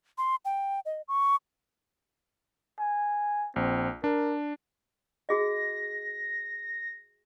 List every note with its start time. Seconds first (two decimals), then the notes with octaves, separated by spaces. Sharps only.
0.18 C6
0.45 G5
0.85 D#5
1.08 C#6
2.79 G#5
3.56 A#1 C4
4.04 D4 A#4
5.29 F#4 G#4 D#5 A#6